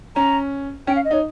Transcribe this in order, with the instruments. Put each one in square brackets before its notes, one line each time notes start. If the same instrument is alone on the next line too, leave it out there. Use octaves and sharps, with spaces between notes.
[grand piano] C#4 [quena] A#5
[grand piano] C#4 [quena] G5
[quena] F5
D#5
[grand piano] D#4 [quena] C#5